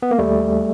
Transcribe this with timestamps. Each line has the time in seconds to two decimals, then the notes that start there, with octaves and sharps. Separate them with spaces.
0.02 B3
0.11 A#3
0.19 D#2 G3 A3